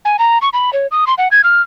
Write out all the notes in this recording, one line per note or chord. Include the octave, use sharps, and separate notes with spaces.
G#5
A#5
C#6
B5
C#5
D#6
C6
F#5
G#6
F6